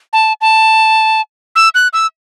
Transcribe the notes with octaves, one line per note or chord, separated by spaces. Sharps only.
A5
A5
E6
F#6
E6